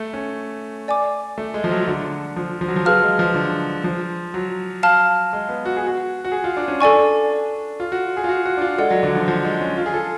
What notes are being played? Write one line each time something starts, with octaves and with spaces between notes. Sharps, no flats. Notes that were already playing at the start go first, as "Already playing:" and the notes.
Already playing: A3
C#4
D5 G#5 D6
A3
G#3
F3
F#3
D3
F3
F3
F#3
F3
F#3 G#4 B4 F5 A5 F6
G#3
F3
D3
F3
F#3
F5 A5 F6
G#3
B3
F#4
G#4
F#4
F#4
G#4
F4
D4
C#4
D4 A4 D5 G#5 C#6
F4
F#4
G#4
F4
F#4
F#4
D4
F4
G#3 A4 D5 F#5
F#3
D3
F3
F3
G#3
C#4
F4
G#4
A4